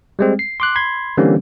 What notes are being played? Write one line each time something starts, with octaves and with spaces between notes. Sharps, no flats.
G3 G#3 C4
C7
C6 D6 F#6
B5 C6 G#6
D3 E3 G3 A#3 C4 C#4